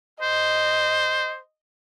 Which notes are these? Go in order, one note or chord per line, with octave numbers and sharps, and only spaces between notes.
C5 D#5